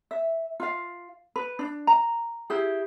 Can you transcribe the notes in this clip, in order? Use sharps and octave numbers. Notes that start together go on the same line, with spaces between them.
E5
F4 F5
B4
D4
A#5
E4 G4 G#4